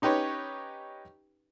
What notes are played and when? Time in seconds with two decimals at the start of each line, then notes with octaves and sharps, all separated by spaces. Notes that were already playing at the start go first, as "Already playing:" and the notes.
0.02 C#4 D#4 G4 B4 C#5